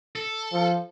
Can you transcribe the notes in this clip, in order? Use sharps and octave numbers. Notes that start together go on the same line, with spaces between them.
A4
F3